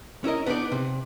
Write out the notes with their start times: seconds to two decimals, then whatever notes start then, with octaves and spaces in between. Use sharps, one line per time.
0.24 C#4 E4 A#4 D#5
0.46 B3 D4 D#4 C#5 D5
0.72 C3